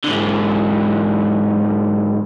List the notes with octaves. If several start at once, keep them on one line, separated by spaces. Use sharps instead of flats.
G#2 D3